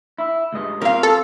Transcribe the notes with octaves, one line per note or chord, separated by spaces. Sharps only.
E4
C#2 G2 D#5
C4 F4 A#4 F5
A4